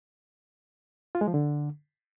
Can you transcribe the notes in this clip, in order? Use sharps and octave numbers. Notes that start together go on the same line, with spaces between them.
F4
G#3
F3
D3